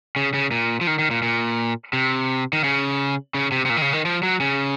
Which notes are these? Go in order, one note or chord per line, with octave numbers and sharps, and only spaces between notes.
C#3
C#3
A#2
F3
D#3
D#3
A#2
A#2
C3
D#3
C#3
C#3
C3
C3
A#2
D#3
C#3
D#3
F3
F#3
C#3